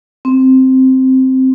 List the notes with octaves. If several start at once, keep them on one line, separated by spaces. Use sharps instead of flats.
C4